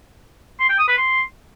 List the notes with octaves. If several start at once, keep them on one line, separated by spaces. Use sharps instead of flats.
C6
G5
D#6
B4
C6